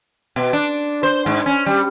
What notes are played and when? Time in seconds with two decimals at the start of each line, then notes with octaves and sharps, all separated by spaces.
0.36 B2
0.53 D4
1.03 C5
1.26 G#2
1.46 C#4
1.66 G3